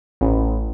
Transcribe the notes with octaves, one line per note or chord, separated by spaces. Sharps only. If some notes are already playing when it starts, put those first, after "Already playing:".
A1